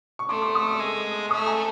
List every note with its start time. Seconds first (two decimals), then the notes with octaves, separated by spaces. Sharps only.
0.19 C#6
0.29 A3 C6 D6
0.42 C6 D6
0.55 C#6 D#6
0.67 D6 E6
0.80 G#3
1.30 A3 C#6 D#6
1.46 G#5 A#5